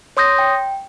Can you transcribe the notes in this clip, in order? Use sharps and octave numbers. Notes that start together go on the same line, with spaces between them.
C#5 C6 D#6 G6 A#6
G5